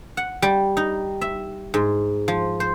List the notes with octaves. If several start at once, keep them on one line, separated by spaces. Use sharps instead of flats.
F#5
G3
D#4
E5
G#2
F3
C5